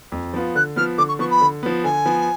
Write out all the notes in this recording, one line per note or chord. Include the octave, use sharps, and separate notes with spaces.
F2
F3 B3 F4
D3 F#6
F3 B3 F6
D3 D6
C#6
F3 B3 C#6
B5
D3
F3 B3
D3 G#5
F3 B3